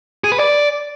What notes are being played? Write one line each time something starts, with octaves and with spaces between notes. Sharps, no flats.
G#4
B4
D5